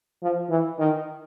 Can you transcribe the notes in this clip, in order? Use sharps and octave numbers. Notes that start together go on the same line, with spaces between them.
F3
E3
D#3